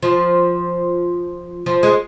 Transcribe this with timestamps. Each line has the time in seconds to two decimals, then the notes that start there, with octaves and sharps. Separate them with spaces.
0.03 F3
1.66 F3
1.83 G#3